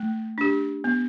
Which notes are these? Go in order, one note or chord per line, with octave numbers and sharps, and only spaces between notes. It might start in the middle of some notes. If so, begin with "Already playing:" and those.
Already playing: A3
D4 G4
B3